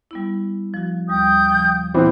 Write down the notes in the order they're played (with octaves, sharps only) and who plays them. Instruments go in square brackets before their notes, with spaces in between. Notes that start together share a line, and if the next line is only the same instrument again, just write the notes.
[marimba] G3 B3 E4
F3 F#4
[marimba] D#2 G3 [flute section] G5 D#6 G6
[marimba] C#3 F3
[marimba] A#2 [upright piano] E3 B3 C4